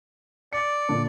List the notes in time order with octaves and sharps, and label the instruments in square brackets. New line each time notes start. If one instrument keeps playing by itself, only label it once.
[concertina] D5 [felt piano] C#7
[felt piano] A#2 D3 D4